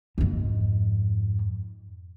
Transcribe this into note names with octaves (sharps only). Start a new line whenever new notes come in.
F2 G#2